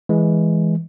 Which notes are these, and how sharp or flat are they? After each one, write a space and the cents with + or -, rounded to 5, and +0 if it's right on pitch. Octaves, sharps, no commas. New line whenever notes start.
E3 +0 G#3 +5